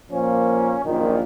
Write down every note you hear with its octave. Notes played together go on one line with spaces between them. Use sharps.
A#2 F3 A#3 C#4
A#1 F#2 A#2 D#3